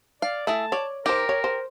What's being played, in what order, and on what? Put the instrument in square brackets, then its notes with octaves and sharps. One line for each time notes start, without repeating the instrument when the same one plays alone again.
[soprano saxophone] D5 [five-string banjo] F5
[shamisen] A3 [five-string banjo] E4 G#4 E5 [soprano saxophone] A5
[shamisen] C#5 [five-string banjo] D5
[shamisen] D#4 C5 [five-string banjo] G4 [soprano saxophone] A#4
[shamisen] C#5
C5